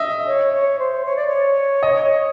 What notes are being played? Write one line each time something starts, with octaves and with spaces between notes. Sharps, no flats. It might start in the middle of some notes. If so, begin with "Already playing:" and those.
Already playing: D#5 E5
C#5
C#5
C5
C#5
D5
C#5
D#5